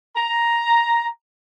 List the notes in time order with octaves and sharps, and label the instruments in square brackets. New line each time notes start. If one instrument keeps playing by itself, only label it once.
[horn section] A#5